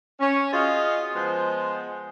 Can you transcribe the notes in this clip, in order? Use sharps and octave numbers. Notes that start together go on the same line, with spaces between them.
C#4
F4 F#4 G#4 C5 D#5 F5
F3 G#3 B3 C5